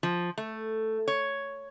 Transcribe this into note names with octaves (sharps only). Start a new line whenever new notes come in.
F3
A3
C#5